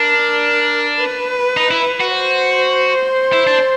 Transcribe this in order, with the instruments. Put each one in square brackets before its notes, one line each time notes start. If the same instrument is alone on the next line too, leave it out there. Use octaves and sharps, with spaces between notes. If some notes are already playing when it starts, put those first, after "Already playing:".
Already playing: [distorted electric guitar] D4 [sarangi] A#4
[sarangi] B4
[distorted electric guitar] D#4
E4
F#4
[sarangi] C5
[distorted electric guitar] E4
D4